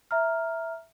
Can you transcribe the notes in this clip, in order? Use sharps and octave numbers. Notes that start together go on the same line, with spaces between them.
E5 A#5 F6